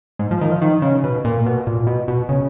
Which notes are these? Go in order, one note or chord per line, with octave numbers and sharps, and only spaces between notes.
G#2
F3
D#3
F3
D#3
C#3
B2
A#2
B2
A#2
B2
B2
C#3